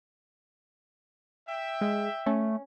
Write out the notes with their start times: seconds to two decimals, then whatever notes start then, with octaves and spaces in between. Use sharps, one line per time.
1.48 E5 G5
1.81 G#3
2.26 A3 C#4